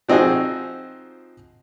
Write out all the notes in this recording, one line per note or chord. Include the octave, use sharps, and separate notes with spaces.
F3 C4 D#4 F#4 G#4